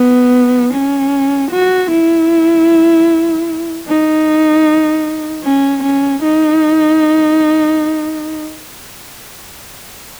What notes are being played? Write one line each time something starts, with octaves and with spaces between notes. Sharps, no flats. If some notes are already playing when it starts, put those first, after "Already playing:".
Already playing: B3
C#4
F#4
E4
D#4
C#4
C#4
D#4